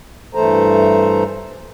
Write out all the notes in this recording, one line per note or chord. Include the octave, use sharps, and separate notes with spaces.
G2 E3 A3 A4 C5 A#5